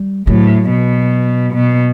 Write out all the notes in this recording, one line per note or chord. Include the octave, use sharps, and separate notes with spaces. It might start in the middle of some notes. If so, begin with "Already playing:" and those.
Already playing: G3
A2 F#3
B2
B2